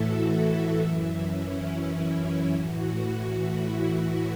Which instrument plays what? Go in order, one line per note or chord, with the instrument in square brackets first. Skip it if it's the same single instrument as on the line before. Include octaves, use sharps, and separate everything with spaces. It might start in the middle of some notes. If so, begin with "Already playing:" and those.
Already playing: [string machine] A2 E3 E4 F#4 A4
F#4
F#2 E3 E4
C#4
C#4
E4
A2 E3 F#4
F#4
E4